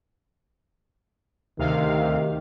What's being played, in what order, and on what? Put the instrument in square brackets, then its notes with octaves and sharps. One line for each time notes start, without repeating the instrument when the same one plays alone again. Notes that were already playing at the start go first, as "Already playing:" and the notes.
[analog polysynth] D2 C3 F5 [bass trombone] D#3